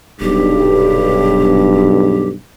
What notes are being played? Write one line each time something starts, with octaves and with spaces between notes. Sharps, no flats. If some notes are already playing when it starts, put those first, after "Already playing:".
D#1 B1 G2 G4